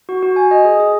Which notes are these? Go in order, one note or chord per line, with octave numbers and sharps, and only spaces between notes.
F#4
F#4
G#5
D#5
G#4
G#4